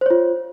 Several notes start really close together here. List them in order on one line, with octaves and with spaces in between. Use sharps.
C5 C#5 F4